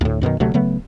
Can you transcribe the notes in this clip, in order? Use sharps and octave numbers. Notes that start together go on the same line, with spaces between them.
D2 A2
F#2 B2 D3 D#3
D2 C3 F#3 A3
C#3 F#3 A3 B3